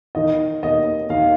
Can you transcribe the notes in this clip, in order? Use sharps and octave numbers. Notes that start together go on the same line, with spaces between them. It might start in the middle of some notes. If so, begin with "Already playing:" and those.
D#3 D#5
D#2 D#5
D#2 F5